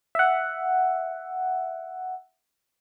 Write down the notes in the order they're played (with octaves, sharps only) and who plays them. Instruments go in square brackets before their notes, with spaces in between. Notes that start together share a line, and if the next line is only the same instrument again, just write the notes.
[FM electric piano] E5 F#5